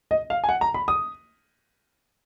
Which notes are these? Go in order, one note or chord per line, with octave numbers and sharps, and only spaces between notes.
D#5
F5
G#5
F#5
A#5
B5
D#6